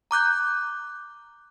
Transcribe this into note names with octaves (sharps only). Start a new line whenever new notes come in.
A#5 D6 F#6 G6